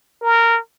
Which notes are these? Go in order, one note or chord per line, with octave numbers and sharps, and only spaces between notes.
A#4